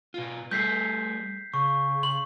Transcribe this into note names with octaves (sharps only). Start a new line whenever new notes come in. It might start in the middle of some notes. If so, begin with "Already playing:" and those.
B2 F4
G3 A3 A4 G6 B6 C7
C#3 C#6
C6 F#7